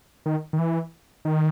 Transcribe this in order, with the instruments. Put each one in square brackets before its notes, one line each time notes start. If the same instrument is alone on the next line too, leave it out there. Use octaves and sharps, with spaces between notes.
[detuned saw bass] D#3
D#3
E3
D#3